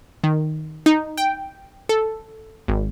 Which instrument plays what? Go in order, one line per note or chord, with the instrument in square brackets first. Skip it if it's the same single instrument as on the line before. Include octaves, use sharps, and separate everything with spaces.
[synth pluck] D#3
D#4
G5
A4
G#1